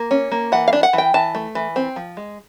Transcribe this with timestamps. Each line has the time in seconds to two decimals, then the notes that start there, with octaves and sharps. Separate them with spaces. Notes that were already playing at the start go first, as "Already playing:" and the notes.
Already playing: A#3
0.11 C#4
0.32 A#3
0.52 E3 F#5
0.68 F5
0.73 D4
0.83 F#5
0.93 E3
0.98 G5
1.14 E3 A5
1.35 A3
1.55 E3
1.76 C4
1.96 F3
2.17 G#3